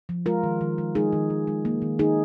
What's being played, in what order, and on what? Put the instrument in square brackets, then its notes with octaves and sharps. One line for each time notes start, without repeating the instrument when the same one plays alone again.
[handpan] F3
G#3 F4 A#4
D#3
D#3
G#3
G#3 D#4 G#4
D#3
D#3
G#3
A#3
D#3
D#3 D#4 G#4